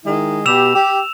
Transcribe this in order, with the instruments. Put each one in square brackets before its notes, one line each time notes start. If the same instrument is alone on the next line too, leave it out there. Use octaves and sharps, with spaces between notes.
[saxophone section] D#3 G#3 E4
[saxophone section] B2 G4 [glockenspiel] E6 E7 F7
[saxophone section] G4